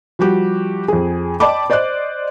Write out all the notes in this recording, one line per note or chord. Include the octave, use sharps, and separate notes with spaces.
F3 G3 F#4 G4
F2 G#4
D5 D#5 G5 A5 B5 D6
C5 D5 D#5 D6 F#6